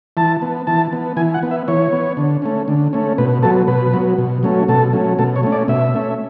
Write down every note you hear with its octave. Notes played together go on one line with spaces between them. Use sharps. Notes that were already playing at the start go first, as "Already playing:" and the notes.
E3 A5
B3
E3 A5
B3
E3 G#5
F#5
B3
E5
E3 C#5
B3
D3
A3 C#4
D3
A3 C#4
B2 B4
F#3 B3 A4
B2 B4
F#3 B3
B2
F#3 A3 C#4
B2 A4
F#3 A3 C#4
B2 A4
C#5
A3 C#4
D5
B2 E5
A3 C#4